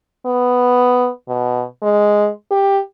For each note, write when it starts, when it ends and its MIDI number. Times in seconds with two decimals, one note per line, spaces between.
0.26 1.09 59
1.28 1.64 47
1.82 2.29 56
2.51 2.80 67